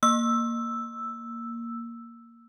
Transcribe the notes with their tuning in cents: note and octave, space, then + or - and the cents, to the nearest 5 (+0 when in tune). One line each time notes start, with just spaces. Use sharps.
A#3 +0 E6 +0